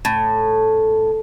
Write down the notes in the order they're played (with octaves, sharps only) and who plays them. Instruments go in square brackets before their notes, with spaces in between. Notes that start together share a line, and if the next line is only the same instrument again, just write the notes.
[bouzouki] A2